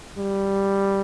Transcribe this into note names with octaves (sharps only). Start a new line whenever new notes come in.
G3